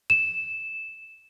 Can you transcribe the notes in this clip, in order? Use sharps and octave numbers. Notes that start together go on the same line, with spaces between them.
E7